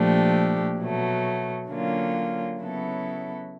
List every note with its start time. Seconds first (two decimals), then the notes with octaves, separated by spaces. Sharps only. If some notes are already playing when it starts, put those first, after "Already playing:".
Already playing: A#2 F3 A3 D4 G4
0.79 B2 F#3 A3
1.69 D3 F#3 A#3 C#4 F4
2.59 C#3 F#3 B3 E4 A4